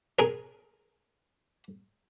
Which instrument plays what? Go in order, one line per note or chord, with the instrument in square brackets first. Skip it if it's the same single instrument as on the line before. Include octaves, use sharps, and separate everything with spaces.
[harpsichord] G#4 A#4